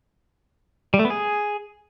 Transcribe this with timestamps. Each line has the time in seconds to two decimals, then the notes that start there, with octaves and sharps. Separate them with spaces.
0.94 G3
0.99 A3
1.05 B3
1.10 G#4